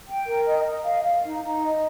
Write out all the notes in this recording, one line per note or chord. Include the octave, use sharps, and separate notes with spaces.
G5
A#4
D#5
D#5
F5
F5
D#4
D#4
D#5